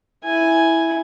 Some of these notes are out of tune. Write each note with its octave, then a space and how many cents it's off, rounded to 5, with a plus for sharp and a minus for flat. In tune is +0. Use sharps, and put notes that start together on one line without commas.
E4 -5 G#5 +0